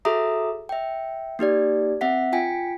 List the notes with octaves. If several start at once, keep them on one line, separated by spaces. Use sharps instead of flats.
F#4 G#4 A4 E5 A#5 D#6
E5 G5
A#3 D#4 G4 D5
C4 E5 F#5 B6
F4 G5 G#5 B6